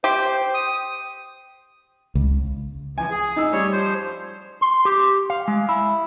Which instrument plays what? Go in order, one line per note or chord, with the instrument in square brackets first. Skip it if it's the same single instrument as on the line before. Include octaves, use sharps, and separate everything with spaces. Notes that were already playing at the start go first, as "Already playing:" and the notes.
[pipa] G4 [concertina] C5
[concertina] D#6
[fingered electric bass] C#2
[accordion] E3 F3 [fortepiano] G#5
[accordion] G#4
[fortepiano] D#4 E6
[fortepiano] G3 [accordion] C#5
[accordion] F3 C5
[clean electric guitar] C6
G4
F5
G#3
E4